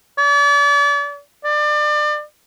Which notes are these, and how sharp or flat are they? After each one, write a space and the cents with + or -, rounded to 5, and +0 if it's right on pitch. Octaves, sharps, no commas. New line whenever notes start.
D5 -40
D5 +30